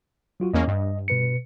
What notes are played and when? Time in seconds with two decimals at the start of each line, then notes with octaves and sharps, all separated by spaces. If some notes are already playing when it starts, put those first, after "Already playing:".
0.40 F#3 F4 F#4
0.54 E2 A#3 C#4 D#5
0.68 G2
1.08 B2 B4 C#7